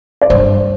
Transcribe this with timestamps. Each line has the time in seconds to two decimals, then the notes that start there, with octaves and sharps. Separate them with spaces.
0.22 D5
0.30 G2 C5